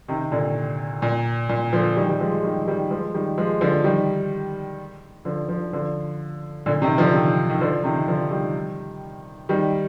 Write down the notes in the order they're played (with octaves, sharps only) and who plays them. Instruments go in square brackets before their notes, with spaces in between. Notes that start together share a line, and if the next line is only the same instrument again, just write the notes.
[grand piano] C3 D#3
A#2 D3
A#2
A#2
D3 F3
D#3 G3
G3
F3 G#3
D#3 G3
D#3 G3
F3 G#3
D#3 G3
F3 G#3
D3 F3
D#3 G3
D3 F3
D3 F3
D3 F3
A#2 D3
C3 D#3
D3 F3
C3 D#3
D#3
D3 F3
C3 D#3
D3 F3
D#3 G3
D#3 G3